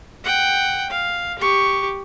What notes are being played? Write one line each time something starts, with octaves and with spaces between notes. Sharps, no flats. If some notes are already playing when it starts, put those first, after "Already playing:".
F#5 G5
F5
G4 C#6